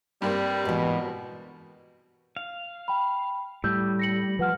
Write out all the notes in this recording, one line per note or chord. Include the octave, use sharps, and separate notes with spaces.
G2 G3 A#3 C4
G#2 B2 E3
F5
G5 B5
A2 G3 E6 G6
A#6 C#7 F#7
F3 B4 F#5 F6